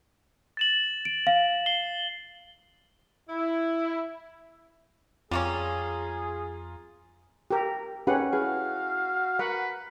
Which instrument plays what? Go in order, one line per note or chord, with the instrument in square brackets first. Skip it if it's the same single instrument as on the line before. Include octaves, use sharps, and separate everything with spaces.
[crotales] A6 E7 F#7
[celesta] D7
F5
[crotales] C7 G7
[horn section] E4
[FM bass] F2 [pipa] G3 A#3 C#4 [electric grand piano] F4 A#5 [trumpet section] G#4
[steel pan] G4 A#4
[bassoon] D#2 [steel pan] C#4 G4 F#5 [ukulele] G#4 B4
[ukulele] E4 G#4 B4 [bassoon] F#4 [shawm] F5
[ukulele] A#4 [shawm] B4 [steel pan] F#5